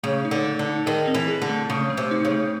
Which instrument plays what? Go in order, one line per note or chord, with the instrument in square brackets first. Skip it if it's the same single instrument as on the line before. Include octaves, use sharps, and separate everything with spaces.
[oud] C#3 [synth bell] A3
[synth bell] D#4
[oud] D3
[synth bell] A3
[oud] D3
[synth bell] D#4
[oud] D#3 [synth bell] G#4
[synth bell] C4
[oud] E3
[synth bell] G#4
[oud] D3
[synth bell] A3
[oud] C#3 [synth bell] A3
[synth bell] A3
[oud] C3
[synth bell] D#4
[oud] C#3
[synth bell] A3